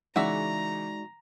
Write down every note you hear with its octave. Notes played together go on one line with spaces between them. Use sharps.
C#3 E3 G#3 D#4 F#4 D5 E5 A#5